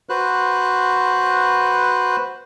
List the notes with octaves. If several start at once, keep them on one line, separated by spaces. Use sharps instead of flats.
F#4 B4 C5 F#6